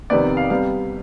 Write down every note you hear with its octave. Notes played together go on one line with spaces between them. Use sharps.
F2 C3 D#3 B3 D5
F5
C3 G3 B3 F5